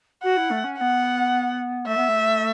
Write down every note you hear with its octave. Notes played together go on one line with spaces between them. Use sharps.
F#4 F#5
E4
A3
C#4
B3 C#4 F#5
A3 E5
B3
A3